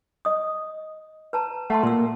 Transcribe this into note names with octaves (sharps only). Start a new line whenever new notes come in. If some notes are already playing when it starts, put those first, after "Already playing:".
D#5 D#6
B4 A5 A#5
A3 F#5 A5 C6
A#2 C6 E6